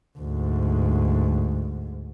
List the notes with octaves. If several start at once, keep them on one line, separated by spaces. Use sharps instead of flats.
D2 G#2